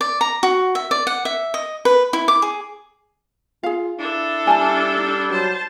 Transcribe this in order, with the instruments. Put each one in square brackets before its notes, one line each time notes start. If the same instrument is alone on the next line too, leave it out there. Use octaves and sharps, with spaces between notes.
[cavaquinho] D5
A#5
F#4
E5
D5
F#5
E5
D#5
B4
E4
D6
G#4
[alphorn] F4 [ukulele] G#4 F5
[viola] D4 A4 [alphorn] E4
[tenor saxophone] G3 [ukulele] G#5 A5
[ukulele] D#4
[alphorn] F#3 [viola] C5 A5